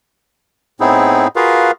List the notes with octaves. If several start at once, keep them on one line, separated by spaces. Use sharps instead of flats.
A2 B3 C4 D#4 E4 G#4
F4 F#4 G#4 A#4 B4 F5